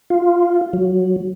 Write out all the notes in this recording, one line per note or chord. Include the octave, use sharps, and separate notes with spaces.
F4
F#3